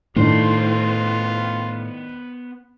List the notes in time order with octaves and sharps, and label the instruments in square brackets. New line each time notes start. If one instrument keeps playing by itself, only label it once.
[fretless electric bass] A2 [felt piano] D#3 D4 [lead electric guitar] B3 C5 [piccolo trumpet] F4